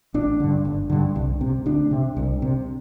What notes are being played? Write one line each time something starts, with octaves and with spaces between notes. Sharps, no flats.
A1 D4
G2 D3
G1
G2 D3
C2
C3
D2 D4
C3
C2
C3